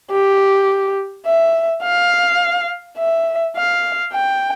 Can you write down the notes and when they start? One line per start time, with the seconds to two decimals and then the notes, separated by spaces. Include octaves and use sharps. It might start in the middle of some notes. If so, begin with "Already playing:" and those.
0.11 G4
1.26 E5
1.83 F5
2.98 E5
3.56 F5
4.13 G5